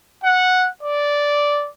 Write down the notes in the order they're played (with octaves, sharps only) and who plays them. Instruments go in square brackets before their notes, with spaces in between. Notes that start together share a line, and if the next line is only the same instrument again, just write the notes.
[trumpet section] F#5
D5